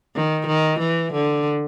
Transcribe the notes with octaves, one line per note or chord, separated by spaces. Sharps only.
D#3
D#3
E3
D3